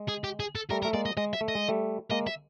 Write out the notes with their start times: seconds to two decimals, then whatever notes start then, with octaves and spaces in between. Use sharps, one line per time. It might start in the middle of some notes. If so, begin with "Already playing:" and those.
Already playing: G#3
0.08 G#4
0.24 G4
0.40 G#4
0.55 A4
0.70 G3 A3 A#4
0.83 A3 A#4
0.94 G#3 A#3 D5
1.06 D#5
1.17 G#3 D#5
1.33 E5
1.41 A3
1.48 D#5
1.55 G#3
1.68 G3 A3
2.11 G#3 A#3 D#5
2.27 E5